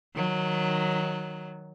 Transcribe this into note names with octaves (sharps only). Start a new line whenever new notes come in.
D#3 F#3